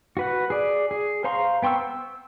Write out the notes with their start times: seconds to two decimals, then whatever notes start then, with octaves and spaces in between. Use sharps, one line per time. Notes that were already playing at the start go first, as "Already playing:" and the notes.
0.17 F#4 B4 F#5
0.50 G#4 D5
0.91 G#4
1.24 C5 F5 A#5 C6 C#6
1.62 B3 G5 C6 C#6 E6
1.79 E6